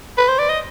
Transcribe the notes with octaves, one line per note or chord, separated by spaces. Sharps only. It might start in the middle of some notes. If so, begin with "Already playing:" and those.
B4
C5
D5
D#5